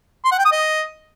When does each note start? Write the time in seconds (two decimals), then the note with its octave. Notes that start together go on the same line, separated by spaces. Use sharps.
0.25 C6
0.32 F#5
0.38 G5
0.45 D#6
0.52 D#5